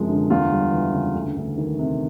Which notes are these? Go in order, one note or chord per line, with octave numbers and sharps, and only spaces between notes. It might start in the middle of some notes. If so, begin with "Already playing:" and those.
Already playing: F#2 C3 F3 G#3
D3
E2 F4
G3
E3
C#3
D2
D2
D#3
C3